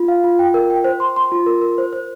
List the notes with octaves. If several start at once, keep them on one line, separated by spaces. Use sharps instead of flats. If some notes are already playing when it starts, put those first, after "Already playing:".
Already playing: F4
F5
F4
G5
A#4
G5
C5
C6
C6
F4
A#4
A#4
C5
C5